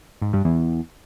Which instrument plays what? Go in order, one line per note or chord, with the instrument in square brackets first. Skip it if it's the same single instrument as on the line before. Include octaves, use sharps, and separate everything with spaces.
[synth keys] G#2
G2
E2